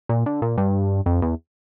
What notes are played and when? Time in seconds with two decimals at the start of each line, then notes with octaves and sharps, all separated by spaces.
0.09 A#2
0.26 D3
0.42 A#2
0.57 G2
1.06 F2
1.22 E2